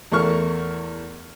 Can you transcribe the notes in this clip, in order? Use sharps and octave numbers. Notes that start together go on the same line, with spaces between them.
E2 A3 A#4 C#6 F6